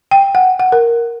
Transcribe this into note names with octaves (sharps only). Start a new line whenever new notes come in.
G5
F#5
F#5
A#4